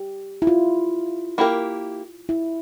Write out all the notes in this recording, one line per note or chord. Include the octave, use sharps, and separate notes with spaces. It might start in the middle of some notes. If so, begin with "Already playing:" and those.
Already playing: G4
E4
F4
A#3 E4 G4 A#4
E4